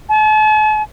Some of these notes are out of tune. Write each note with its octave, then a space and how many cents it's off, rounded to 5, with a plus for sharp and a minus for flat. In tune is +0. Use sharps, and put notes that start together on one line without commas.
A5 -45